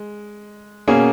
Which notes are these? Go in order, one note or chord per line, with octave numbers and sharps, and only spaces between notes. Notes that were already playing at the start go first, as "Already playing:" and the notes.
Already playing: G#3
B2 A#3 C#4 G#4